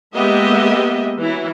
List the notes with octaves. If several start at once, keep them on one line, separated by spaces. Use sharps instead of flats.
G#3 A#3 B3 G4 D#5 E5
E3 F#3 E4